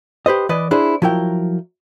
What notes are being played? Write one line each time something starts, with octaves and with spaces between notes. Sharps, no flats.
G4 B4 C5 D#5
E3 B4 D5 D#5
D4 E4 G#4 C5
F3 F#3 E4 A#4 G5